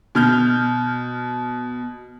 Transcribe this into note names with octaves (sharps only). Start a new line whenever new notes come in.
B2 F6 G6